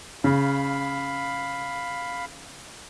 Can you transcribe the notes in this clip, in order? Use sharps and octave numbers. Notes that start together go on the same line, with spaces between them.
C#3 F5 B5